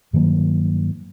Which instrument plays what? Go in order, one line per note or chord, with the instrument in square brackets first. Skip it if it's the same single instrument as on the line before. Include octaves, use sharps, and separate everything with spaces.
[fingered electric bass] G2 D#3 F#3 A#3